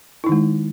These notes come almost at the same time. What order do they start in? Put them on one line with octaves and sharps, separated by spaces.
E4 D#4 D#3 G#3